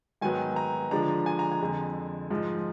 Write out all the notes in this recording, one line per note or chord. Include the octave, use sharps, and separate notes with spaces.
G#2 D#3 F#3 B3 G#5
A#5
D3 F3 G#3 D4 A#5
G#5
A#5
G#5
F2 D3 G#3
G#2 F3 G#3 D#4